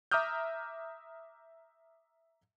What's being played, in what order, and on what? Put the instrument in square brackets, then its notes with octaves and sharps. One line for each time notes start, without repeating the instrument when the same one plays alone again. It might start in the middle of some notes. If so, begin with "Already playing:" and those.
[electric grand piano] E5 A#5 D6 D#6 F6 G6